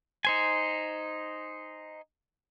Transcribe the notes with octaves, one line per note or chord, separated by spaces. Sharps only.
D#4 C5 G#5